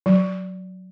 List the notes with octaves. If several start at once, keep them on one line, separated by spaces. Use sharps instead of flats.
F#3